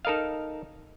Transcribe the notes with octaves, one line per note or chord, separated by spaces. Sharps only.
D#4 A4 A#4 D#5 F5